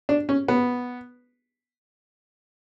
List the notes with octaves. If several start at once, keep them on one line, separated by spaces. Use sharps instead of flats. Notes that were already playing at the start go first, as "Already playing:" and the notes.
D4
C#4
B3